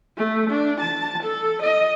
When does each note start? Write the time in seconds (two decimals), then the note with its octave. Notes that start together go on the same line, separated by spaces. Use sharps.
0.18 A3
0.50 D4
0.81 A5
1.23 A4
1.62 D#5